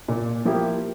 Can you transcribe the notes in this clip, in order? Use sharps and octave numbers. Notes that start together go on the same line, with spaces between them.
A#2
F3 A#3 E4 G4